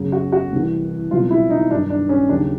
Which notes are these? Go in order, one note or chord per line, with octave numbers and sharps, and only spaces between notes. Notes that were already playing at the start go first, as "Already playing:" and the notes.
Already playing: F#2 C#3 F#3
F#4
F#4
C2 C3 E3
C2 B2 F#3 F4
E4
D#4
G2 D#3 F#3 D4
D4
C#4
D#2 C#3 F#3 D4